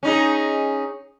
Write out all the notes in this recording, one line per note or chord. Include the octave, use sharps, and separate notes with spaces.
C#4 D#4 G#4